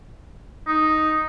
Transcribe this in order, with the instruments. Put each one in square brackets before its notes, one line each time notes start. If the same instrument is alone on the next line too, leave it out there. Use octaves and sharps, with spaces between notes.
[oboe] D#4